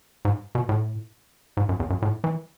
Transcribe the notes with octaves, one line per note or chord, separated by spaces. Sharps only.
G#2
B2
A2
G#2
F#2
E2
F#2
A2
E3